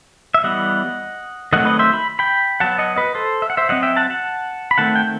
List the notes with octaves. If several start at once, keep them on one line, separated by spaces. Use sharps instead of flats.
E5
E3 G3 B3 D#5 F#5
D#3 F#3 A3 C4 D#5 F#5
B4 D#5
C5 E5
B5
G5 B5
F#3 B3 F#5 A5
D#5 F#5
B4 D#5
A4 C5
E5
F#5
C5 E5
F#3 C4 D#5 F#5
E5 G5
F#5 A5
F#5 A5
B5
D#3 A3 C4 F#5 A5
G5